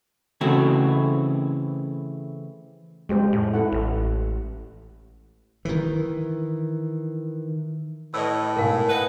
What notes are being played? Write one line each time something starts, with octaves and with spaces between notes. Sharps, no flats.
C#3 E3 A3 C4 F#4
F2 G#3 G4 C5
A2
E4 A4 F#5
A1
D#3 E3
A2 B4 C#5 D#5 E6
G#2 B2 A#4 F5 G#5
B4 D#5 F#5